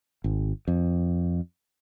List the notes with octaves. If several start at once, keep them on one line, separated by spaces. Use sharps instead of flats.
G#1
F2